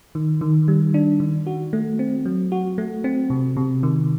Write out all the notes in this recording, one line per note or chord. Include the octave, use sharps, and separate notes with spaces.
D#3
D#3
G3
D4
D#3
F#4
A3
C4
F#3
F#4
A3
C4
C3
C3
D#3